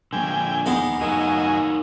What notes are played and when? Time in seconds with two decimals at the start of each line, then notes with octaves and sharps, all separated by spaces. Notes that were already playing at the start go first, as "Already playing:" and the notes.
0.13 D3 F3 A#3 G5 G#5
0.66 D#2 G#3 B3
1.01 F#2 D#4 A#4 C#5 D#5 G#5